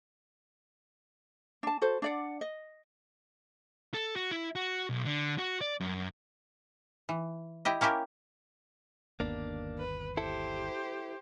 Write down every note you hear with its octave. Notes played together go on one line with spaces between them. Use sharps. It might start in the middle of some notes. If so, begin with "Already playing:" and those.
D4 A5
F#4 A4 C5
D4 D5 F#5
D#5
A4
F#4
E4
F#4
B1
D3
F#4
D5
F#2
E3
E4 G4 D#5
A#3 C#4 E4 G4 A#4
G1 D#2 A#3 B3 D4
B4
E4 G4 A4 C5